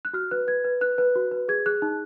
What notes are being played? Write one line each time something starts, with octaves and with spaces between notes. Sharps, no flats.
F#6
F#4 F6
B4 F#6
B4 G#6
B4
B4 F#6
B4
F#4
B4
G#4 G#6
G#4 F#6
D#4